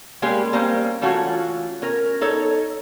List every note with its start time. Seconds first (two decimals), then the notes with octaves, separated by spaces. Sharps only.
0.22 G3 G#3 A#3 C#4 G4
0.53 G3 A#3 C4 C#4
1.01 E3 A3 C#4 F4 F#4
1.82 C#4 A#4
2.21 D#4 A4 C#5